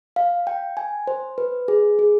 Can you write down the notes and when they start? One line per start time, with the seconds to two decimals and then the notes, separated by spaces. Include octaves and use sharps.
0.16 F5
0.47 G5
0.77 G#5
1.07 C5
1.38 B4
1.68 G#4
1.99 G#4